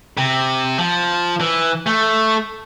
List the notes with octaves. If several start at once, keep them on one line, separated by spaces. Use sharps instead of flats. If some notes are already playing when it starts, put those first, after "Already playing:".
C3
F3
E3
A3